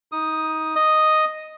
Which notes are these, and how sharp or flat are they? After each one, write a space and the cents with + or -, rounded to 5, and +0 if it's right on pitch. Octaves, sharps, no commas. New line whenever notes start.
D#4 +25 D#6 +0
D#5 +0 D#6 +0